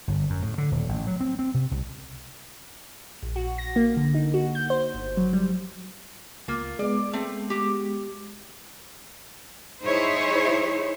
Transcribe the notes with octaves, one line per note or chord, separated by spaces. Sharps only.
G1
F#2
A2
D3
D#1
A1
F#3
C4
C4
C3
C2
A#1
F#4
A#6
A#3
D3
D#4
F#4
G6
C5
G1
F#3
G3
C#2 A#3 F4
G#3 B3 D5
A3 C4
F#4 G4
D#4 E4 G#4 C5 C#5